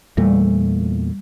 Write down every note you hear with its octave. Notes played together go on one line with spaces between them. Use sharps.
E2 A#2 G3 A3